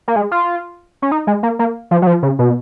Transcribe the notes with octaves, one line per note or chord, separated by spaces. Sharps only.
A#3
G#3
F4
C#4
D#4
G#3
A#3
A#3
F3
F#3
F3
C#3
B2